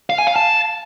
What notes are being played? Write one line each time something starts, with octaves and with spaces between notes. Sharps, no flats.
F5
G#5
F5
A5